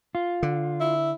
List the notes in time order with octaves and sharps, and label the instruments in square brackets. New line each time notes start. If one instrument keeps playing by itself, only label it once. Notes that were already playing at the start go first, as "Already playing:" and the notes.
[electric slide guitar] F4
[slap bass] D3
[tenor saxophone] E4